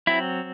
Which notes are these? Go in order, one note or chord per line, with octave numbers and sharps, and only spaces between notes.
F#3 C4 E4